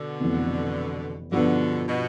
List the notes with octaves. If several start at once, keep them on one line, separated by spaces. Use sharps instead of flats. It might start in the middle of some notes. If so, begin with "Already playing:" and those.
Already playing: B2 D3
F1 F2 E3 B3
G2 B2 D3 F3 B3 D4
B2